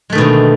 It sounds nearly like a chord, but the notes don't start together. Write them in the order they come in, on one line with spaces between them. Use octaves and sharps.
G#3 A3 D#3 B2 D3